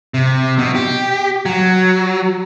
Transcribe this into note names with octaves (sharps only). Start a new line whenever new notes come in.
C3
B2
G4
F#3